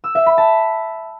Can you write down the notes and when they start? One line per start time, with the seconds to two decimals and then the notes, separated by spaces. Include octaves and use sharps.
0.04 E6
0.15 E5
0.26 B5
0.38 A5